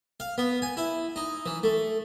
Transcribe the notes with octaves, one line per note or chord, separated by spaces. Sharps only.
F5
B3
G#5
E4
D#4
E3
A3